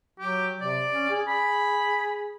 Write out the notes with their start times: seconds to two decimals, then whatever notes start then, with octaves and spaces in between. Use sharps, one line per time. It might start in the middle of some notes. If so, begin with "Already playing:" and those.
0.19 F#3 G4
0.61 C3 D5
0.92 C#4
1.09 G#4
1.28 B5